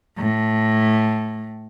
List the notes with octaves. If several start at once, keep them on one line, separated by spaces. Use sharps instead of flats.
A2